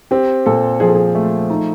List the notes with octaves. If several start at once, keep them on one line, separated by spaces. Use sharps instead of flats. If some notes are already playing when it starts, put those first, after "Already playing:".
C4 G4
A#2 A4
F3 G#4
A4
G#4
A3
D#4